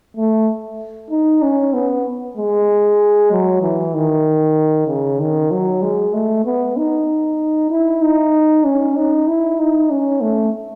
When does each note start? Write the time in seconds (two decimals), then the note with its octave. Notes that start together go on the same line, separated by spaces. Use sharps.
0.17 A3
1.10 D#4
1.42 C#4
1.73 B3
2.37 G#3
3.31 F#3
3.62 E3
3.94 D#3
4.88 C#3
5.20 D#3
5.51 F#3
5.82 G#3
6.13 A3
6.45 B3
6.77 D#4
7.70 E4
8.02 D#4
8.64 C#4
8.96 D#4
9.27 E4
9.59 D#4
9.90 C#4
10.21 A3